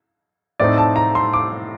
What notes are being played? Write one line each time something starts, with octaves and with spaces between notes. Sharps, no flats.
A2 A3 C4 D#4 D5
A5
A#5
C6
D6